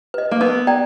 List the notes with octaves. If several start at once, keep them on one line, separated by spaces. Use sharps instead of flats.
B4 D#5
A#3
B3 A#4
D5 G5 A#5